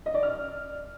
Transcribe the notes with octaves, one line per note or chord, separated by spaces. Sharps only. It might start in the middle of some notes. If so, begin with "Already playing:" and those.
D#5
D5
F6